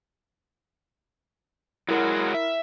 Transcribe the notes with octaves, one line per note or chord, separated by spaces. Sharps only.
F#3 G#3 E4 F#4 A#4
E5